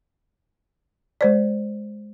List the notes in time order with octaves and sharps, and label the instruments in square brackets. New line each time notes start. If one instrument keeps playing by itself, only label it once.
[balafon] G#3 C5 D5